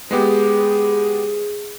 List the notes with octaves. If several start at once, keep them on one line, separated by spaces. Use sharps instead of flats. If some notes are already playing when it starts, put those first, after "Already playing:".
G#3 B3 G4 G#4